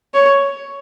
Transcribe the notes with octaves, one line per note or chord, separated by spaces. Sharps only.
C#5